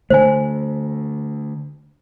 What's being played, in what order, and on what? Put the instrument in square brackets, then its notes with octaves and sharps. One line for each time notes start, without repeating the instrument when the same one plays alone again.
[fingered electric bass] D3 A3 [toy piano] C5 G#5